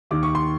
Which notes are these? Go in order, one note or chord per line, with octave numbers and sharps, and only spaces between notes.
D#2 D#3 D6
C#6
C6